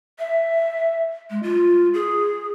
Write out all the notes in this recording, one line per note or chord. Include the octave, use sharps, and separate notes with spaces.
E5
G#3
F4
G#4